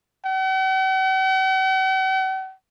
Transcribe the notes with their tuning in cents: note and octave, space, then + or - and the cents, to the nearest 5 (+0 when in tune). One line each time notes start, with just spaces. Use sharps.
F#5 +45